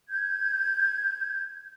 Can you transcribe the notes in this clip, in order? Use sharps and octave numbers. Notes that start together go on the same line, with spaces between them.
G6 G#6